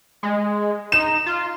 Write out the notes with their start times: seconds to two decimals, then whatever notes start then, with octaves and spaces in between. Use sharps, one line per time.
0.23 G#3
0.92 D#4 E7
1.26 F4